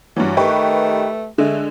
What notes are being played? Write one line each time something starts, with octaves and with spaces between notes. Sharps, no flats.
G2 E3 F#3
D#3 A3 G4 B4 C#6
D3 G#3 A3